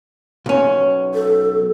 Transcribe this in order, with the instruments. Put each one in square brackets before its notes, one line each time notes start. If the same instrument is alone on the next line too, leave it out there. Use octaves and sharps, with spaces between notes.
[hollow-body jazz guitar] B1 C#4
[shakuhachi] A4